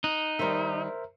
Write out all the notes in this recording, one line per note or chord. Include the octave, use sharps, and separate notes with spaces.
D#4 F#6
D#3 G3 A#4 C5 E5